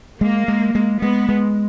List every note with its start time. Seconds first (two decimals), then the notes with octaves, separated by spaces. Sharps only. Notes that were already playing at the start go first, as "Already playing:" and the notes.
0.21 G#3 A#3
0.48 G#3
0.75 G#3
1.02 G#3 B3
1.29 G#3